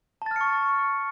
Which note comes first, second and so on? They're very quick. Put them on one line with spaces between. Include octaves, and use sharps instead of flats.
A5 A6 F6 C#7 C#6